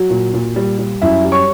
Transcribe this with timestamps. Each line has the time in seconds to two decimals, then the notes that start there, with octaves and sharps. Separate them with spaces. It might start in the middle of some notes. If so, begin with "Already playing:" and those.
Already playing: F#3 F#4
0.10 A#2
0.34 A#2
0.56 G3
0.79 G3
1.02 F#2 E4 E5
1.25 G3
1.32 C#5 C#6